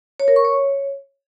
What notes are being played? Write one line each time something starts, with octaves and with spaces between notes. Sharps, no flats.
C#5
A#4
C#6
C#5